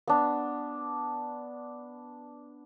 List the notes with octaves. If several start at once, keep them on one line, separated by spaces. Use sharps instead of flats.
B3 D4